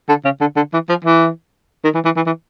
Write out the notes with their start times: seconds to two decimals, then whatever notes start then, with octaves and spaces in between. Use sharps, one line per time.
0.09 D3
0.25 C#3
0.40 D3
0.56 D3
0.73 E3
0.89 F3
1.04 E3
1.84 D#3
1.94 E3
2.05 E3
2.16 E3
2.26 E3